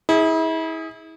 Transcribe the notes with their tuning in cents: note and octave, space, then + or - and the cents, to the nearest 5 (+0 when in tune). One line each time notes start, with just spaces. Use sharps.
E4 -35 G#4 +0